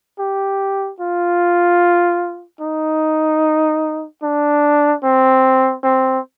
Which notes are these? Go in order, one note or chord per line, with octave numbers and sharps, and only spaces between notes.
G4
F4
D#4
D4
C4
C4